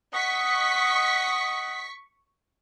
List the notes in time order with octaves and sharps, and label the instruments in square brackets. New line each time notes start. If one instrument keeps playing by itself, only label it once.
[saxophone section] D#5 F#5 [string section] C#6 B6